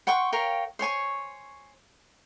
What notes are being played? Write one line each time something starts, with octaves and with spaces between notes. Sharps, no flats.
F#5 G5 C6 C#6
A#4 C#5 F5 G5
C5 C#5 G#5 C#6